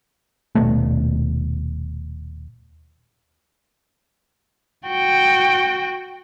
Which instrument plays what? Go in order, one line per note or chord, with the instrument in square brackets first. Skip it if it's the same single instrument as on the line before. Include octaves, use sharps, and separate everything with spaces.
[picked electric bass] D#1 D#2 B2 A3
[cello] F#4 G5